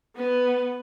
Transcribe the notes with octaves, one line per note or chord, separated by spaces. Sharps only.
B3 B4